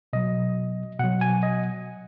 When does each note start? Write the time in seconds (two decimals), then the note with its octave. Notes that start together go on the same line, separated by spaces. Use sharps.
0.13 B2 F#3 D#5
0.99 B2 F#3 F#5
1.21 G#5
1.43 D#5